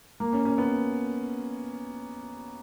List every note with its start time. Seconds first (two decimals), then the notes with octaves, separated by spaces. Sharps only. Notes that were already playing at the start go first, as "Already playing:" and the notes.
0.20 A#3
0.33 C#4
0.45 C#4
0.58 B3